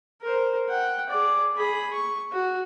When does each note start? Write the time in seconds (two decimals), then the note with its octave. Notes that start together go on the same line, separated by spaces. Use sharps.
0.22 A#4 C5
0.69 F#5 G5
1.09 G#4 D5
1.57 G#4 B5
1.93 C#6
2.32 F#4